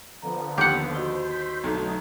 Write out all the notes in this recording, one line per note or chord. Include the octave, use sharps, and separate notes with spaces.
D3 F3 B3 A#5
D#2 G4 F#5
F#4 C5 D#5 G7
C6 G6 B6
B1 D3 F#3 A3 D#4